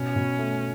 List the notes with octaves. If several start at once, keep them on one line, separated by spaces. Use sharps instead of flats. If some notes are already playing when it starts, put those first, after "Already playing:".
Already playing: B2 C#4
B2
A3